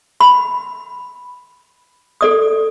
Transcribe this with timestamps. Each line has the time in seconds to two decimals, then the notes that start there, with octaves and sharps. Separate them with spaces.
0.21 B5
2.21 A4 D5 D#6